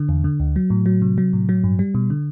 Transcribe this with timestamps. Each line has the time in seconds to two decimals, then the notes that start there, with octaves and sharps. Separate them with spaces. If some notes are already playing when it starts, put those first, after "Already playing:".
Already playing: D3
0.09 E2
0.24 D3
0.40 D2
0.56 F#3
0.70 A2
0.86 F#3
1.02 C3
1.18 F#3
1.33 A2
1.49 F#3
1.64 G2
1.79 G3
1.94 B2
2.10 D3